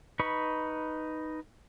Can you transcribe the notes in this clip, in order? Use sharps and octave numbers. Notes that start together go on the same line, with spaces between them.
D#4 B4 B5 C#6